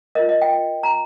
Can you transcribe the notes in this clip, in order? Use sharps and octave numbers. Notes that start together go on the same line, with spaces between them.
F4 A#4 D#5
D#5
G5
A#5